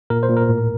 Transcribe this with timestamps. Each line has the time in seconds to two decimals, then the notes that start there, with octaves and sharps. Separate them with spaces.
0.10 A#2 A#4
0.23 C5
0.29 A#2
0.37 A#4
0.49 A2